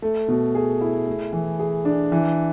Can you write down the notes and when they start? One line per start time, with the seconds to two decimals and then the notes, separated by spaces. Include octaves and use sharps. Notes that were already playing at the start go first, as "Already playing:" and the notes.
0.02 A3
0.28 B2
0.55 G#4
0.81 E4
1.07 A3
1.33 E3
1.59 G#4
1.85 D4
2.12 E3